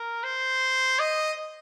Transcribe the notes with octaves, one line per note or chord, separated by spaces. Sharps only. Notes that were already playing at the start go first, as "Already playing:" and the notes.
Already playing: A#4
C5
D#5